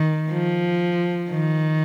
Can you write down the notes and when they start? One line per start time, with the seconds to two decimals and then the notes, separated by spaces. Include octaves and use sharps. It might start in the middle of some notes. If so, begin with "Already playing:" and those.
Already playing: D#3
0.31 F3
1.30 D#3